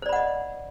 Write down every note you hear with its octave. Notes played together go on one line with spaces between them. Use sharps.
C5 D5 D#5 F#5 B5